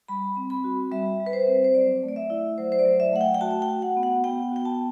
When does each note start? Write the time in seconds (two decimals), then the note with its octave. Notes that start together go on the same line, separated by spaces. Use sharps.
0.08 G3 B5
0.36 C4
0.50 B5
0.64 F#4
0.92 G3 E5
1.20 G3
1.26 B4
1.33 C5
1.47 C4
1.64 C5
1.74 F#3 D5
2.03 A3
2.08 D5
2.16 E5
2.30 E4
2.58 F#3 C5
2.72 C5
2.79 D5
2.85 F#3
3.00 E5
3.13 A3 F#5
3.21 G5
3.34 G5
3.41 F#4 A5
3.51 A5
3.62 G5
3.69 F#4
3.82 F#5
3.97 B3
4.03 F#5
4.24 B3 G5
4.52 F#4 G5
4.65 A5